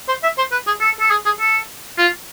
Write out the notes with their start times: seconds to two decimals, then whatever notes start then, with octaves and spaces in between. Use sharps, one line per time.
0.08 C5
0.23 E5
0.38 C5
0.52 B4
0.67 G#4
0.81 A4
1.00 A4
1.11 G#4
1.25 G#4
1.40 A4
1.98 F4